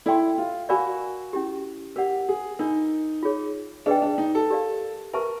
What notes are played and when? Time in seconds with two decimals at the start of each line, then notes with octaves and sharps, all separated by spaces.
0.06 E4 A4 D5 G5 C6
0.38 F4
0.69 F#4 A#4 D5 F5 G#5 B5
1.33 C#4 E4 G4
1.96 G4 A#4 D5 F#5
2.29 G#4
2.59 D4 D#4 F4 A#4
3.23 F4 G#4 C#5
3.86 D4 G#4 B4 D#5 G5
4.02 D4
4.18 D#4
4.35 A4
4.50 G4 A#4 D5 F5
5.13 A#4 B4 E5 A5 C#6